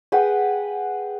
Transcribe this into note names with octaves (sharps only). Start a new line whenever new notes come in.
G#4 B4 F#5 G5